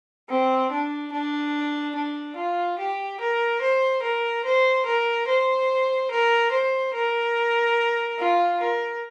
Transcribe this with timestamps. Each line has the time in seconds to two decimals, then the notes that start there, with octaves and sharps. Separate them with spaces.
0.29 C4
0.71 D4
1.12 D4
1.95 D4
2.36 F4
2.79 G4
3.20 A#4
3.61 C5
4.02 A#4
4.45 C5
4.86 A#4
5.27 C5
6.11 A#4
6.52 C5
6.94 A#4
8.19 F4
8.60 A#4